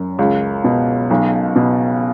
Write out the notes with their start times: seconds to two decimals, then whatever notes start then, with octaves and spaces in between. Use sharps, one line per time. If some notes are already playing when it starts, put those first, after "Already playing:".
Already playing: F#2
0.19 C#2
0.64 B2
1.10 B1
1.56 B2